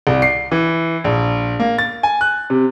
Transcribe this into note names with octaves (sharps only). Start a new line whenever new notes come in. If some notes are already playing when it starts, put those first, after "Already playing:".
C2
C7
E3
A#1
A#3
A6
G#5
F#6
C3